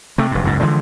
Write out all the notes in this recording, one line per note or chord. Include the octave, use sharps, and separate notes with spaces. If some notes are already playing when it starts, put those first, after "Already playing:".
C3 A3
F1 G2
F#1 C#2 G#2
D3 E3 F3 G#3